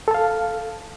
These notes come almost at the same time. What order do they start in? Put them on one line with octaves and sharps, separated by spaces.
A4 A5 F5